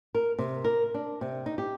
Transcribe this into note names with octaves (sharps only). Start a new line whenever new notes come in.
A#4
C3
A#4
D4
C3
D#4
G4